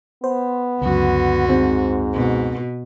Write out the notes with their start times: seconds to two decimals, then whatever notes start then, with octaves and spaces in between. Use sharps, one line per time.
0.24 B3 C5
0.82 C#2 F#2 D3 F#4
1.49 G#2 C4
2.14 B2